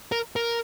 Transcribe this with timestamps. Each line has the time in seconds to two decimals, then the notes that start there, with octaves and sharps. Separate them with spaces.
0.12 A#4
0.36 A#4